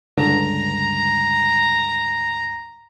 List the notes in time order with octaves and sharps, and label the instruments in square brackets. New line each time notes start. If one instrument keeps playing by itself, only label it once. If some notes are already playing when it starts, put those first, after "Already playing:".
[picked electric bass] C#2 G2 D3 [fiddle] A#5